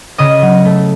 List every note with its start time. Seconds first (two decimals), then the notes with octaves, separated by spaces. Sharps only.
0.18 C#3 D#5 D#6
0.42 F#3
0.65 A3